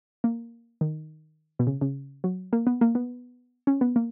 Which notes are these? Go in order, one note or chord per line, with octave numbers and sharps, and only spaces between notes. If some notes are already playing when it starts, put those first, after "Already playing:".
A#3
D#3
B2
C#3
C#3
F#3
A#3
B3
A#3
B3
C#4
B3
A#3